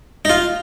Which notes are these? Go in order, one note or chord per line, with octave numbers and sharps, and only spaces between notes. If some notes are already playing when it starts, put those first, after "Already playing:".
D#4
F4